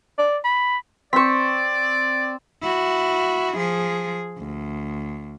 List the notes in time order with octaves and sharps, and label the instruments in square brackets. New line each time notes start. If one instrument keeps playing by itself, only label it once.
[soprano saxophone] D5
B5
[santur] C4 C5 [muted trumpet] D5 [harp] C#6 B6
[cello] E4 F#4
F3 G#4
D2